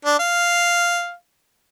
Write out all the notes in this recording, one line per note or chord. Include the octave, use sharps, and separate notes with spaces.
D4
F5